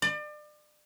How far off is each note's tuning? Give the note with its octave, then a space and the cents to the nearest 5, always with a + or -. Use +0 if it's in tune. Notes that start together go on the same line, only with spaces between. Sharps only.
D5 +35